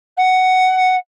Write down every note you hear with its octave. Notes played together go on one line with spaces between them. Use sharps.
F#5